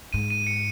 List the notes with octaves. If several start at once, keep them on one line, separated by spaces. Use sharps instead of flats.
G#2 D#7
D#7
C#7